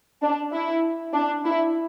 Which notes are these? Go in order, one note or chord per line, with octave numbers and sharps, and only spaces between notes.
D4
E4
D4
E4